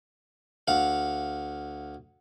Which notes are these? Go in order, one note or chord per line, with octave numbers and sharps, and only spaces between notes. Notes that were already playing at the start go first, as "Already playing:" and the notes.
D2 F5 F#5